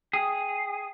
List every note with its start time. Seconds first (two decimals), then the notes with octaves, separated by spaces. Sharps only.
0.13 G#4 G5 D#6